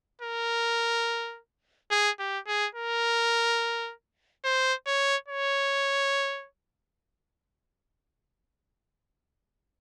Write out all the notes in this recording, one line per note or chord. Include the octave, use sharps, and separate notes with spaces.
A#4
G#4
G4
G#4
A#4
C5
C#5
C#5